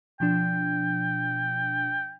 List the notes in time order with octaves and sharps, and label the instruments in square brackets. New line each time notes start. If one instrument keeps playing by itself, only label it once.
[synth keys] B2 F3 D4 [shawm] G5